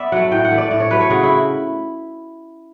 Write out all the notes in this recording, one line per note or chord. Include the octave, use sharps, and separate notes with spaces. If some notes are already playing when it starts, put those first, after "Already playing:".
Already playing: B3 D5 E5
F#3 A3 F#5
A2 G5
F#5
E3 A3
D5
A2 D5
C#5
F#3 A3 B4
C#5
C#3 F#4
E4